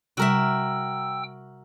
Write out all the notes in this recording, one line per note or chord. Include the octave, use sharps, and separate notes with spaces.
C3 G3 F#4 A#4 E5 G5 E6